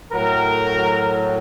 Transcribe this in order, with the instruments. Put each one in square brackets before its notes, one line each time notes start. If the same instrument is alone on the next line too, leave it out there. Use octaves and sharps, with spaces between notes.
[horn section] A2 F#3 A#4